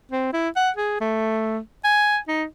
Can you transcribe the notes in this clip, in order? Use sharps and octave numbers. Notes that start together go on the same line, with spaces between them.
C4
E4
F#5
G#4
A3
G#5
D#4